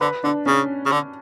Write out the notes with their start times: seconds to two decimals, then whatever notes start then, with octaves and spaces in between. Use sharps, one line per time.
0.01 D3 B4
0.24 D3 D4
0.46 C#3 C#4
0.86 C#3
0.92 D3